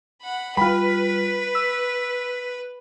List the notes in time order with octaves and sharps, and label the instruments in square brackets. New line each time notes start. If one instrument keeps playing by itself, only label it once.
[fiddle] F#5 B5
[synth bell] G3 F4 [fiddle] B4 [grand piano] B5 [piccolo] B6
[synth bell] E6